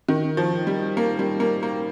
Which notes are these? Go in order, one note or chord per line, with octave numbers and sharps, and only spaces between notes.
D#3
F3
G3
A#3
G3
A#3
A#3